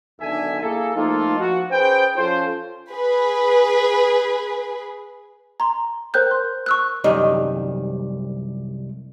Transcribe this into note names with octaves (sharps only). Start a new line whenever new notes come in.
B1 D3 D#3 A4 E5 G#5
A#3 E4 G#4 A4
F3 A3 A#3 D#4 F4 A4
F3 F#4
C#4 G#4 B4 C5 G5
F3 C#4 F4 A4 C5
G#4 B4
A#5 C6
A#4 C5 G5 F#6 G6
C6
C#6 E6 F#6
C2 F#2 D#3 G3 D#5